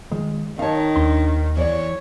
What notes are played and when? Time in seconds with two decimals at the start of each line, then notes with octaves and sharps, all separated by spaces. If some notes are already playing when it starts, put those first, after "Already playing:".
0.12 D#3 G#3 F4
0.59 D#3 D#4 C#5 F5 A5
0.96 D#2 D4 C6
1.57 E2 E3 C#5 D5